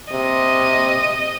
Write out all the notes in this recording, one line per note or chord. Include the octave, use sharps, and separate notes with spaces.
C3 D#5